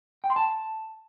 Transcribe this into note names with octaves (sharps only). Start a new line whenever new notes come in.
G5
C6
A5